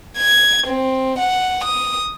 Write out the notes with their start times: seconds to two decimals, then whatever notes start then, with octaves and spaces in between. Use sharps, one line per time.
0.18 G#6
0.67 C4
1.18 F#5
1.64 D#6